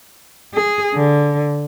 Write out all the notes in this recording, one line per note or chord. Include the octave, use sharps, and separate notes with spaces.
G#4
D3